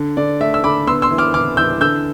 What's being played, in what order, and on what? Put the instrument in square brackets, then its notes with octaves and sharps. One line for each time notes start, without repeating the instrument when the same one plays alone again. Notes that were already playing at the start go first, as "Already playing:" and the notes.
Already playing: [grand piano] D3
D3 D5
A3 E5
E6
D3 B5 D6
B3 C6 E6
C6 E6
E3
D6 F6
E3 D6 F6
E3 E6 G6
D3 E6 G6